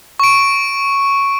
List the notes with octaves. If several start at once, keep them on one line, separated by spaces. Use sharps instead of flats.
C#6 D7